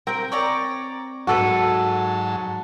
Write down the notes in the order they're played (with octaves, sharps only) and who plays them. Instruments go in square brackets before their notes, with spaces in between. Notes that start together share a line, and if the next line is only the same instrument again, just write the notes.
[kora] C4 G5 [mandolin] A#4
[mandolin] C#5 D5 A#5
[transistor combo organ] G#2 F#3 A5 [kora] F#4 A4 B4